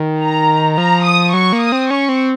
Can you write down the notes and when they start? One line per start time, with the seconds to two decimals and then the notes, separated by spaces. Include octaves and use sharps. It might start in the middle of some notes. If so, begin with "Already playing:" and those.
Already playing: D#3
0.21 A#5
0.77 F3 A#5
1.06 D#6
1.34 F#3 C#6
1.53 A#3
1.62 D#6
1.72 C4
1.90 C#4 C#6
2.09 C4